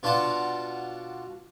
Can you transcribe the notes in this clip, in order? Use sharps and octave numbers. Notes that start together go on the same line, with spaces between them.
B2 D4 F4 F#5 A5